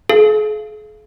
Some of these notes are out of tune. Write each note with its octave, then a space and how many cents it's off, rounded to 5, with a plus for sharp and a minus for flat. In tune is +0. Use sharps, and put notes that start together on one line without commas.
G#4 +45 F5 -25